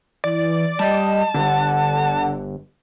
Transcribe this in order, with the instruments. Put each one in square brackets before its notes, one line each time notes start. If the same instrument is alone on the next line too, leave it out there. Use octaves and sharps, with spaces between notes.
[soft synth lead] E3 [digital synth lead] D5
[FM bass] G3 [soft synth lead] D#5 [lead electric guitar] A5
[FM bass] G1 [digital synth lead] D3 [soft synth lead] F#5